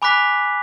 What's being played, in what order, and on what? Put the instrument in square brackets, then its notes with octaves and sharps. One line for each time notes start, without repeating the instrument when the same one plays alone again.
[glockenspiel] G#5 B5 D6 F#6 B6